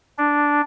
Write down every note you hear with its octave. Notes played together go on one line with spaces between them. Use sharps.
D4